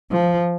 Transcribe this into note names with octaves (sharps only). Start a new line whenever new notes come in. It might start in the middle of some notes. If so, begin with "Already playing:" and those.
F3